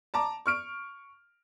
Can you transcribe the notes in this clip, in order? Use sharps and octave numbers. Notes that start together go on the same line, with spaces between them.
A5 A#5 D6
C#6 F6 D7